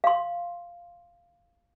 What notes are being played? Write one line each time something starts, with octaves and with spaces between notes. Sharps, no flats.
F5 C6